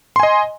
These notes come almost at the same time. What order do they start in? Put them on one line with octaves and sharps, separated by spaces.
C6 G#5 D#5